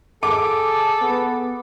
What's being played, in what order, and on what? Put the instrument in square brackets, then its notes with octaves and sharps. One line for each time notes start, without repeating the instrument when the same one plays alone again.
[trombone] G#4 [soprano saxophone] A4 [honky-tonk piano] D6
[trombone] B3